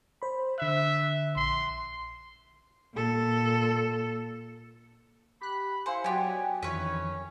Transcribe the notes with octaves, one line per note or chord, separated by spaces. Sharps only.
C5 B5
D3 E5 F#6
A#1 C6
A#2 A4
G4 B5 F#6
E4 C5 F5 G#5 C#7
F#3 B3 F#4 G4 C#5 D5 F#5 G#5
F2 D#3 E3 C#4 B4 C#5